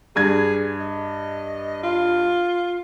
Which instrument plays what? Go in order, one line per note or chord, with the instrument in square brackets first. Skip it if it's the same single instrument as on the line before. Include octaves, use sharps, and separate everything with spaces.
[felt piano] G2 G#6 [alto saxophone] G#4
[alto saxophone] D#5
F4